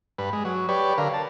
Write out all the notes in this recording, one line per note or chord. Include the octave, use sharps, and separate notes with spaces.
G2 B4
G#3
F#3
G4 B4 C#5 D5
D3 A#4 F5
A5